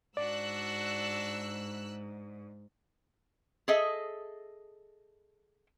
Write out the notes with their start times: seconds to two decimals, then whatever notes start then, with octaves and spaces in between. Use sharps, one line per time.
0.17 G#2 D4 F#4 D5 E6 F#6
3.68 G#4 A4 D#5 E5